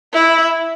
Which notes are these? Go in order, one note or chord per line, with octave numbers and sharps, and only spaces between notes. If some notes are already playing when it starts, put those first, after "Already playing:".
E4